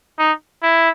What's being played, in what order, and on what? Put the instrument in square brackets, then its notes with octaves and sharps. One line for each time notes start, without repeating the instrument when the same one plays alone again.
[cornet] D#4
E4